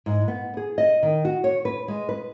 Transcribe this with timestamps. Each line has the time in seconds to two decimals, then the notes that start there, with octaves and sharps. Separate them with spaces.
0.06 G#2
0.28 B3
0.57 G#4
0.78 D#5
1.03 D#3
1.25 F#4
1.44 C#5
1.65 B4
1.88 G#3
2.09 B4